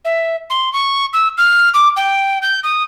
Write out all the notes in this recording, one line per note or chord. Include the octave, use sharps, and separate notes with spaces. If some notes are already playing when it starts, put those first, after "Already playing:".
E5
C6
C#6
E6
F6
D6
G5
G6
D#6